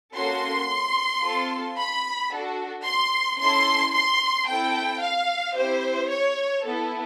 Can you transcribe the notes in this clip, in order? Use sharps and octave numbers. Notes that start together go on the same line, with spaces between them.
A#3 C#4 F#4 A4 C6
C4 F4 A4
B5
D4 F#4 A4
C6
C#4 E4 A4 C6
C6
C4 E4 A4 G5
F5
C4 E4 G4 C5
C#5
B3 E4 A4